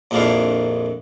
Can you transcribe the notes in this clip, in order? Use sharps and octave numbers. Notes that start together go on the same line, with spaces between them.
A#1 F2 A#3 D4 E4 F5